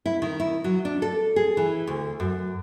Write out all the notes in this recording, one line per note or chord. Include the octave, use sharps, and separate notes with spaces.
E4
D#3
E4
F#3
D4
A4
G#4
E3
D2
F#2